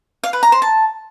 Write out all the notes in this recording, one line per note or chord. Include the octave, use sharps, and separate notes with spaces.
F5
B4
A#5
C5
A5